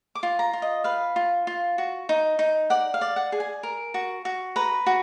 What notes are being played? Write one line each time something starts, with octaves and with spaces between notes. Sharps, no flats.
D6
F4
A#5
F4
D#5
B4 F5
F4
F4
F#4
D#4
D#4
D5 F#5
F5
D5
F#5
G#4
G#5
A#4
F#4
F#4
B4 A#5
F#4